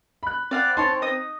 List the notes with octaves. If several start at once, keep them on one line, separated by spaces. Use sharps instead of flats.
B5 F#6
C4 D5 F5 F#5
D#4 C#5 A5 C6
D#5 D#6